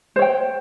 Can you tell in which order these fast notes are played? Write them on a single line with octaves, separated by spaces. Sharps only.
C5 C#5 G5